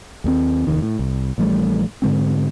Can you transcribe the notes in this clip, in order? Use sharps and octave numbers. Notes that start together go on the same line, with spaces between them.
D#2 G#3 C4
F1 D#2 D#3
A2
C2
A#1 E3 G3 A3
G#2 D3 G#3 C4